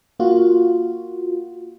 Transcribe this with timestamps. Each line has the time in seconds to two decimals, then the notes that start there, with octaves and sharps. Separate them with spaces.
0.19 A#3 F4 F#4